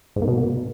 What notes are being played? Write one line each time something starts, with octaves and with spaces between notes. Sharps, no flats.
G#2
A#3
B2